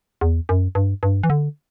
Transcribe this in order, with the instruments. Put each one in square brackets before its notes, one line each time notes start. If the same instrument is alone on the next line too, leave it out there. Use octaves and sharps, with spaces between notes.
[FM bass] E2
F#2
G2
G2
E3
D3